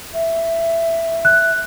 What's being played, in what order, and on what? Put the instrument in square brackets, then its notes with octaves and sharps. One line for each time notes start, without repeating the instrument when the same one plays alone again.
[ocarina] E5
[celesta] F#6